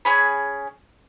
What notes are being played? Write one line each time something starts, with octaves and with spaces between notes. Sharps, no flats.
C#4 G#4 B5